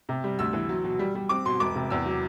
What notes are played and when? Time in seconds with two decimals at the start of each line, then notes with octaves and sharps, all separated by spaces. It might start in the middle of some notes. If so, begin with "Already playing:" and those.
0.09 C3
0.24 G3
0.39 D2 E6
0.53 E3
0.69 F#3
0.84 B2
0.99 G3
1.15 G3
1.29 C4 D6
1.45 B2 C6
1.60 E1 D6
1.76 C3
1.90 E2 E6
2.06 F#3